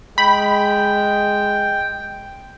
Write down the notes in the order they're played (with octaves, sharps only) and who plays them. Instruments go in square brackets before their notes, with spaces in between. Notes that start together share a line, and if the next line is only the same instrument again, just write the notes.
[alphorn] G#3 [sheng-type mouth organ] G5 [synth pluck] B5